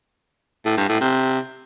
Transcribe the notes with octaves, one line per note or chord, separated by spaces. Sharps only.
A2
G2
A2
C3